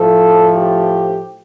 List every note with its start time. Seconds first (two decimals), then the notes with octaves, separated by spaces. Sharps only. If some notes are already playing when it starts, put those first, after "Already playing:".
Already playing: A2 F3 A3 A4
0.55 G4